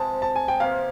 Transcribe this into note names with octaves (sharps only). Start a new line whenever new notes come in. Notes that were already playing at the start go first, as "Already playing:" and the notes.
Already playing: C3 F3 G#3 A5
A5
G#5
G5
C3 F3 A#3 F5